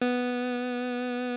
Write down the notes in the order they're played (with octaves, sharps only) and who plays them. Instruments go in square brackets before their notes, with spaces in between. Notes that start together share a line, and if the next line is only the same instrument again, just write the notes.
[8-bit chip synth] B3